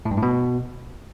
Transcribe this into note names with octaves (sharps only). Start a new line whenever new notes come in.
A2
G2
A2
B2